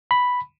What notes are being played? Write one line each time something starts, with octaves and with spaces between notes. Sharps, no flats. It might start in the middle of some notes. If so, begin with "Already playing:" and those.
B5